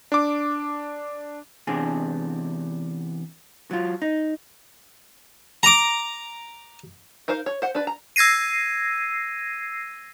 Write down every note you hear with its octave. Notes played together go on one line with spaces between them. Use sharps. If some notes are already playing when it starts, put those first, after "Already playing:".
D4 D6
E2 C3 D4 G#4
F#3 F4
D#4
A#5 D6
D#4 A#4 C5 F5
C#5
C5 F#5
D4 B4
A#5
E6 G#6 A#6 C7 D#7